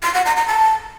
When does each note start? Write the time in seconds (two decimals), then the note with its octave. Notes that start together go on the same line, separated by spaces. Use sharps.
0.03 C6
0.14 F#5
0.26 A#5
0.37 A#5
0.48 A5